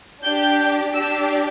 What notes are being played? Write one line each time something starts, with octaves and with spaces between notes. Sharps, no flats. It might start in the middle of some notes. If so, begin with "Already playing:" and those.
D4 G4 G6
D4 G4 E6